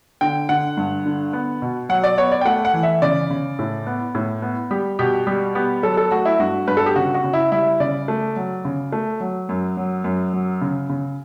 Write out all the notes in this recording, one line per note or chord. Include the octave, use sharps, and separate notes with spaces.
D3 G5
D3 F#5
G2
D3
B3
B2
F#3 F#5
D5
B3 C#5
D5
G5
A3 F#5
F#5
E3
E5
C#3 D5
C#3
A2
B3
A2
B3
G3 G4
B2 G4
G3 G4
B3 G4
F#3 A4
A4
A3 F#4
E4
G2 F#4
G2 B4
A4
G4
C#3 F#4
F#4
C#3
E4
G3 E4
C#3 D5
A3
F#3
C#3
A3
F#3
F#2
F#3
F#2
F#3
C#3
C#3